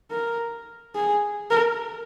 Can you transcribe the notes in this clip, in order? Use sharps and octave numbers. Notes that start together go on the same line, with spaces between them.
A#4
G#4
A#4